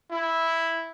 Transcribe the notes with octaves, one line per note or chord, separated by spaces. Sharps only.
E4